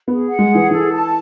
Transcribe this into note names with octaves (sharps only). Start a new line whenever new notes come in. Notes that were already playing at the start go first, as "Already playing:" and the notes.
B3 G#4
F#5
G#3
G#4
E3
E3 A4
A5